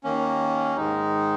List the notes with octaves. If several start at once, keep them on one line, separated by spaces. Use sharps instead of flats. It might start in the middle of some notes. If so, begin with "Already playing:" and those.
D#2 D#3 A#3 C#4
G#2 D#3 G#3 D#4